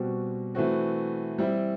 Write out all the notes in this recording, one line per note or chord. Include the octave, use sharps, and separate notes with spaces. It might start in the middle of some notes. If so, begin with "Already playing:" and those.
Already playing: B2 G3 C4 F#4
E3 A3 C4 F#4
G3 C4 E4